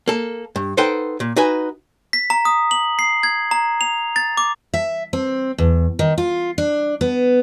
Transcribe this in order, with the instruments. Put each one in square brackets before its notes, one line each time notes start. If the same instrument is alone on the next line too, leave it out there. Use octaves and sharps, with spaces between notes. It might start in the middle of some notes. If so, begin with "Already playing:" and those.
[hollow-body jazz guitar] A#3 A4
G2
D#4 A4 B4 C5 F#5 G5
A#2
D#4 F#4 B4 G#5
[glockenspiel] B6
A#5
D#6
F#7
C7
G#6
A#5
F7
A6
D6
[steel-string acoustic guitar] E5
C4
E2
D#3
F4
D4
B3